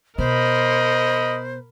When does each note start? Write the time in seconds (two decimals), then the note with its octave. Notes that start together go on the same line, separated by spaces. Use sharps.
0.18 B2 A#4 C5 D#5 B5